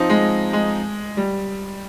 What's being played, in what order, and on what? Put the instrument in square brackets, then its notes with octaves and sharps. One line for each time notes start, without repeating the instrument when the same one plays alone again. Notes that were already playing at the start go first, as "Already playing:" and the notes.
Already playing: [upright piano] F3 C4 D#4
[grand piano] G#3
G#3
G3